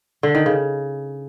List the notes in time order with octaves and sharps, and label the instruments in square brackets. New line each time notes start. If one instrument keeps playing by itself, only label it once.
[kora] D3
D#3
C#3